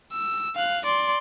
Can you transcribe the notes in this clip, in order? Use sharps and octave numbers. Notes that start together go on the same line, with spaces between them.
E6
F5 F#6
D5 C6